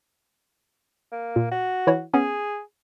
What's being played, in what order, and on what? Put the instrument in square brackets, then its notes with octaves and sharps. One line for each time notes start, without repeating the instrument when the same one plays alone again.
[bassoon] A#3
[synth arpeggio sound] A#2
[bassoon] F#4
[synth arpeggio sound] E3 E4 C#5
[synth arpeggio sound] B3 C#4 [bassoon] G#4